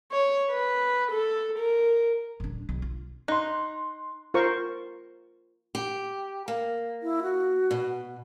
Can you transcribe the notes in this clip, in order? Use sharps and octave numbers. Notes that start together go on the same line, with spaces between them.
C#5
B4
A4
A#4
D#1 D4
B1
F4
D#4 C6 F#6
F4 A#4 C5 C#6
G4
A#3
E4
F#4
B2